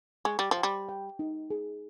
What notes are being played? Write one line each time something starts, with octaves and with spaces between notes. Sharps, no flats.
G#3 C#6
G3
F3
G5
G3
G5
D#4
G#4